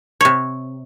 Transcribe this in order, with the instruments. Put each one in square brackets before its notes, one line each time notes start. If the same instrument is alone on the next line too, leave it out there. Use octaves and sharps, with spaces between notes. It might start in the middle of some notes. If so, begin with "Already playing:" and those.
[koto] C3 C#5